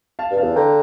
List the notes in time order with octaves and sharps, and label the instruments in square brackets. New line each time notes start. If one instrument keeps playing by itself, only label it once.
[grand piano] F5 A5
[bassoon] G2
[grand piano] F5 A5
[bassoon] E2
[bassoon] D3 [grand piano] G5 A#5